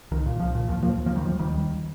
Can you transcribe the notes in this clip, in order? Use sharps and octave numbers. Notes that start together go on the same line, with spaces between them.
C2 D#3
A#2
C2 F3
A#2
D#2 F3
F3 A#3
D#2
F3 A#3
D#3 G3
D#2 F3
D#3 G3
D#2